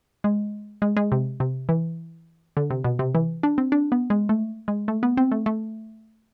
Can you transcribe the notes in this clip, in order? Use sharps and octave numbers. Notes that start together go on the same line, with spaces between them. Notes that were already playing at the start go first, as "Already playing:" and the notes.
G#3
G#3
G#3
C3
C3
E3
D3
C3
B2
C3
E3
D4
C4
D4
B3
G#3
A3
G#3
A3
B3
C4
A3
A3